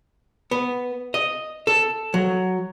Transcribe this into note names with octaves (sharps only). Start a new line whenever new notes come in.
B3
D#5
A4
F#3